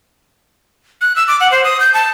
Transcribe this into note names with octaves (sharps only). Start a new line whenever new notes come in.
F#6
E6
D6
F#5
C5
D#6
G6
A5